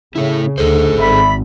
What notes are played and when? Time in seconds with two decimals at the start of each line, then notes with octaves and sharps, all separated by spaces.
0.15 C#3 A3 E4
0.58 D2 G#4 A4 C5
0.99 G#1 D5 E5 B5